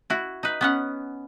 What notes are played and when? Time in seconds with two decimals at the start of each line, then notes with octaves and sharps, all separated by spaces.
0.10 E4 F#4
0.43 D#4 B4
0.61 B3 C#4 F#5